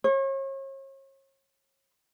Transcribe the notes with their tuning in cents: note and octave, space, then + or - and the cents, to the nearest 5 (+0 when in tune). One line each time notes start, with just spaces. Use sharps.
C#5 -40